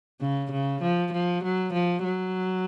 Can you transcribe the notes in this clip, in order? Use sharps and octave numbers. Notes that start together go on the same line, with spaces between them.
C#3
C#3
F3
F3
F#3
F3
F#3